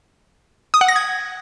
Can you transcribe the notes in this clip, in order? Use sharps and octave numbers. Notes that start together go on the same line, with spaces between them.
D#6
F#5
A#6
G#6